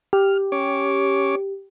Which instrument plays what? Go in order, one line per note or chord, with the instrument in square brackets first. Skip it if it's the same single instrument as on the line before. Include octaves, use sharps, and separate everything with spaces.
[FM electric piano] G4 [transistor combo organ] F6
[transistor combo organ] C#4 C#5 D6